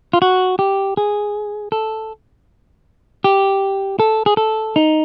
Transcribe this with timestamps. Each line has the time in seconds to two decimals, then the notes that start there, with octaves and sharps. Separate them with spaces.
0.13 F4
0.22 F#4
0.59 G4
0.97 G#4
1.72 A4
3.24 G4
4.00 A4
4.26 G#4
4.37 A4
4.76 D#4